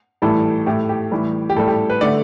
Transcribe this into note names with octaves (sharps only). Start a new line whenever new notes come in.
A2 E3 G3 A4
A2 A3 G4
G4
A2 E3 G3
G4
A2 G3 A4
G4
B4
D3 A3 D5